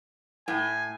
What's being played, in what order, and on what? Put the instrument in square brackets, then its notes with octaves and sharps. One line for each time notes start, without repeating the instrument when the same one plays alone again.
[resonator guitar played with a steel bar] A2 [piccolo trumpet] G#5